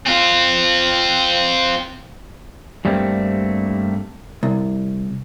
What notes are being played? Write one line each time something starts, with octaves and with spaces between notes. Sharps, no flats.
C4 F4
G2 G3 A3 A#3 C4
C2